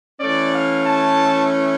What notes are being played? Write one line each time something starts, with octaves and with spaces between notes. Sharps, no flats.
E3 A3 C#4 D5
F5
A5